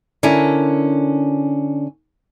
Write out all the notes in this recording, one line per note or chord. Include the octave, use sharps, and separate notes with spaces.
D3 C#4 D4 E4 A#4